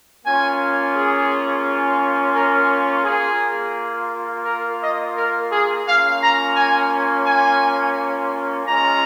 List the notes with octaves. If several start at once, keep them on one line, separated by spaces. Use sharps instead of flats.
A#3 C#4 F4 G#5
G#4
A#4
A#3 F4 G#4
A#4
D#5
A#4
G#4
A#3 C#4 F4 F5
A#5
G#5
G#5
G#3 C#4 F4 A#5